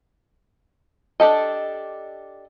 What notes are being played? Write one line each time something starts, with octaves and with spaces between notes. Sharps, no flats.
D4 G4 A4 D#5